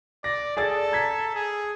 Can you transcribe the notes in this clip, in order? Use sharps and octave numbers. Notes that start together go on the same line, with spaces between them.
D5 A#6
G#4 A4 D5 A6
A#5 G#6 B6
G#4